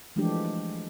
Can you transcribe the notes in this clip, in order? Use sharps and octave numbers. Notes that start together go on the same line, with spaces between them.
E3 F3 G#3 A3 D4 G4